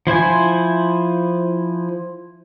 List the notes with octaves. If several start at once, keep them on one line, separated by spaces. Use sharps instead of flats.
F3 E4 C5 G#5